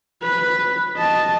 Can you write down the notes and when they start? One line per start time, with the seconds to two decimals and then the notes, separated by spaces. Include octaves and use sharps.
0.23 B4
0.98 D#5 A5